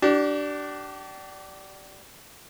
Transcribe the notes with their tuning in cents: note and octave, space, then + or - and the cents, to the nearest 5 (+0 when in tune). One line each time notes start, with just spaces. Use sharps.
D4 +0 G4 -40